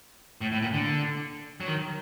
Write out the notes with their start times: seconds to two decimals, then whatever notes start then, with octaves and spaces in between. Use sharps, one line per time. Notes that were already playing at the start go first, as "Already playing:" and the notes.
0.41 A2
0.52 A2
0.62 A#2
0.73 D3
1.61 F#3
1.68 D#3